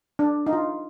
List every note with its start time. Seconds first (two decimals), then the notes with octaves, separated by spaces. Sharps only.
0.19 D4
0.46 D#4
0.53 F4